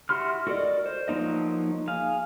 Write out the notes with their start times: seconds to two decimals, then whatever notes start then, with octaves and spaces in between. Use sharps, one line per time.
0.09 E4 F#4 G4 C6 F6
0.47 F#4 A4 A#4 D5 D#5
0.86 C5
1.08 F3 F#3 A#3 D#4 D#5
1.88 G#4 F5